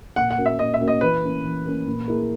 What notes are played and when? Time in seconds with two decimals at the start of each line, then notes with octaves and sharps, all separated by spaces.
0.16 A#2 F#5
0.31 F#5
0.38 A#3 C#4 F#4 A#4
0.46 E5
0.59 A#2 D#5
0.74 E5
0.80 A#3 C#4 F#4 A#4
0.88 D#5
1.01 E3 B4
1.23 A#3 C#4
1.44 E3
1.66 A#3 C#4
1.87 A#2
2.08 A#3 E4 G#4